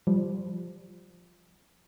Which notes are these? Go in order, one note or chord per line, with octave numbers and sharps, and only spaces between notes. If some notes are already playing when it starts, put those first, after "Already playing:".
F3 G3